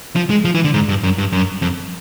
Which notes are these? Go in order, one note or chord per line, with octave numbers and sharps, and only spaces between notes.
F3
G#3
F3
E3
D3
G#2
G2
F#2
G2
F#2
F2